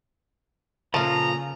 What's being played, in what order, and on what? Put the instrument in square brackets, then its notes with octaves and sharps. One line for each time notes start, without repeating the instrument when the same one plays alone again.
[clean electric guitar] A#2 F3 [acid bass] C#3 [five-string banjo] A4 F5 [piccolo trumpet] A#5